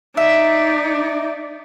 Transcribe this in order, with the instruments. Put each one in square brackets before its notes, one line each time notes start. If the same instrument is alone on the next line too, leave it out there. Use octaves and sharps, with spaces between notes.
[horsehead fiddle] D#4 D5 [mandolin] E5